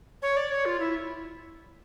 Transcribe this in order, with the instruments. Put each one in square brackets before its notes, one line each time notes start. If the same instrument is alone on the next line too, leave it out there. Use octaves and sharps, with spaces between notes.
[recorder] C#5
D5
C#5
F4
E4